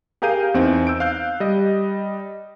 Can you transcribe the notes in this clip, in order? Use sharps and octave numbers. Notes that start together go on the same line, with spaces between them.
G4 G#4 A#4 F5 G6 D#7
E2 C4 D#4
E6 G6 D7
F5 F#6 G6
G3 D#5